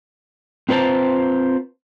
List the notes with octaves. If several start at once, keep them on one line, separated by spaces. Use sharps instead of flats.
C4 F4 B4 C5 A5 A#5